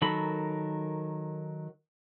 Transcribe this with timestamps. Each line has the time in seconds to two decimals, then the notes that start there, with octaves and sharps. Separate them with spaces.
0.02 D#3 F#3 A4 A#4 B5